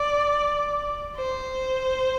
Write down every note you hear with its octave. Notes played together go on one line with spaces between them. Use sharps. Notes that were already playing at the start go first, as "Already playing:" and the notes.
Already playing: D5
C5